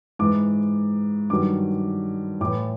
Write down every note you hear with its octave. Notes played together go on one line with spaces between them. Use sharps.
G#2 E3 D6
G2 D#3 F#3 D6
A2 E3 D6